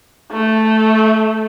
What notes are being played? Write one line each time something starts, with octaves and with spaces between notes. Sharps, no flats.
A3